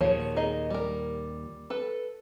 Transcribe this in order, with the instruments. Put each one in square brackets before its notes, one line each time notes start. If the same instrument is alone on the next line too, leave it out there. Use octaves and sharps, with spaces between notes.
[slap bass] D#2 A#2 [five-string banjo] F3 G#4 C#5
[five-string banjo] D#4 G#4 D#5
G3 A#4
A4 B4